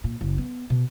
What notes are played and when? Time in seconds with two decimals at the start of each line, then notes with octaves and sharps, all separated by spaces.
0.04 A#2
0.21 F#1
0.38 B3
0.70 B2